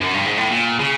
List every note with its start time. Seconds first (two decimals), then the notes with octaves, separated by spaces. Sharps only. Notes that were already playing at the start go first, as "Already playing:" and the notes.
0.01 F#2
0.14 G2
0.26 G#2
0.37 A2
0.50 A#2
0.79 C#3